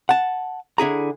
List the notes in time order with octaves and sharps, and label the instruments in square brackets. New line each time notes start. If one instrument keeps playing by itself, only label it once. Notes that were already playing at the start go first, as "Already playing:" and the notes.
[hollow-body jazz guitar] F#5 A5
D3 E4 G#4 A#5